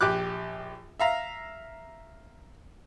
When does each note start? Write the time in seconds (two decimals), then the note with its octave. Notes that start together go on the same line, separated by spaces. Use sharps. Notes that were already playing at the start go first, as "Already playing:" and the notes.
0.01 A#1 G4 D6 F#6
1.00 E5 F5 A#5